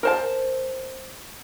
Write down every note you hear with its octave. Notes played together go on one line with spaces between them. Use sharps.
A#4 C5 A5